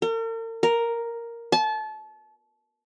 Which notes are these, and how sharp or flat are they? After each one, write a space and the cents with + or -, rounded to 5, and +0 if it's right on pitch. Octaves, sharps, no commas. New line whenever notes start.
A#4 -45
A#4 +0
A5 -30